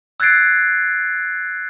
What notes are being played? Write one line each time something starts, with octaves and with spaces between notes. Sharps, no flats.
E6 F#6 G#6 A6 C7 D7